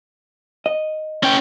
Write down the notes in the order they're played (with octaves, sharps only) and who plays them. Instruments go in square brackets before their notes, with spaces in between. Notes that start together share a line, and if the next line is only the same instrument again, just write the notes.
[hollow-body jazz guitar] D#5
[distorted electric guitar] C#4 G5